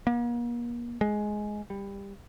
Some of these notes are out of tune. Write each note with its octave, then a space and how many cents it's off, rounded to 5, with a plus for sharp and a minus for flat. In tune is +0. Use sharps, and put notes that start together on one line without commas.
A#3 +40
G#3 +10
G3 +20